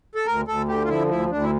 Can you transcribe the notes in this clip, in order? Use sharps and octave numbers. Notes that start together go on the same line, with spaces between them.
A4
D2 A#4
D2 A4
D3 G4
F4
F3 E4
D2 E4
D2 D4
E4